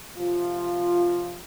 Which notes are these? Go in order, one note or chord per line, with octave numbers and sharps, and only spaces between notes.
C3 F3 F4